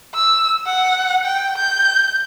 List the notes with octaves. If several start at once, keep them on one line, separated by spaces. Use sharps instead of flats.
E6
F#5
G5
G6